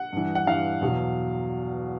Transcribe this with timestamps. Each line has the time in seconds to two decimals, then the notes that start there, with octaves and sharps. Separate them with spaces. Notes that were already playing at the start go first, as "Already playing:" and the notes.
Already playing: F#5
0.13 G2 E3
0.35 F#5
0.47 G2 E3 F5
0.81 E2 B2 F#3